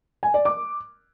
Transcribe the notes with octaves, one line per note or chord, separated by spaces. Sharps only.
G#5
D5
D6